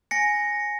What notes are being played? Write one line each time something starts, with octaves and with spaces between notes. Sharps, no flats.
G#5 A#6 C#7